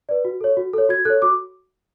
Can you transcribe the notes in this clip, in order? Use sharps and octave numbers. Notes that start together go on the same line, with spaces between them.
B4 D5
F#4
A4 C#5
F#4
A4 C#5
F#4 G#6
A4 C#5 F#6
F#4 D6